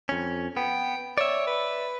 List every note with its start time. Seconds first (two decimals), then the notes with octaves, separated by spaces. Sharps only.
0.09 F2 C#4
0.57 B3 G5
1.18 C#5 D5 E5
1.47 B4